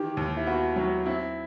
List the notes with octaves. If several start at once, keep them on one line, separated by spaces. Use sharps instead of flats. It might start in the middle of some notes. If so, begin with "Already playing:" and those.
Already playing: D#3 E3 G4
D#2
E4
B3 F#4
F#3
C4 E4